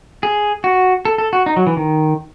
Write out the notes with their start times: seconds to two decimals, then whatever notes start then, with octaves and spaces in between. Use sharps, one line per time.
0.23 G#4
0.64 F#4
1.05 A4
1.18 A4
1.33 F#4
1.46 D#4
1.56 F#3
1.67 E3
1.77 D#3